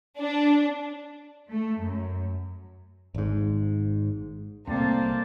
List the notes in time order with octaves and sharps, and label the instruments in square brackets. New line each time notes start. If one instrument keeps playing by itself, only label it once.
[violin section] D4
[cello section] A3
F#2
[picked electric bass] G#1 G#2
[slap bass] C2 A2 [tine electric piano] A3 C4 [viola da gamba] A#3 [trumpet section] C5 D5 A5